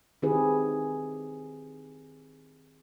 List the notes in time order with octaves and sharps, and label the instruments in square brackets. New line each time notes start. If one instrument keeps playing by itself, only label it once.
[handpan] D#3 C4 E4 G4 G#4 B4